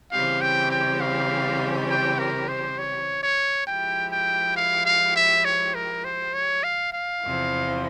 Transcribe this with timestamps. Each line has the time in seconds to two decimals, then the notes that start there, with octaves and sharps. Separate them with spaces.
0.11 C#3 E3 G3 C4 G4 F5
0.41 G5
0.71 G5
1.00 F5
1.90 G5
2.19 A#4
2.48 C5
2.78 C#5
3.23 C#5
3.67 F3 G#3 E4 G4 G5
4.12 G5
4.56 F5
4.85 F5
5.16 E5
5.45 C#5
5.75 A#4
6.04 C5
6.34 C#5
6.64 F5
6.93 F5
7.22 E2 C3 F3 C4 E4